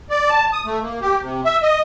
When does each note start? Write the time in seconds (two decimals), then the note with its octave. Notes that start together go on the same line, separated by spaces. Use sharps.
0.10 D5
0.30 A5
0.53 D#6
0.66 A3
0.82 A#3
1.01 G4
1.22 C3
1.45 E5
1.62 D#5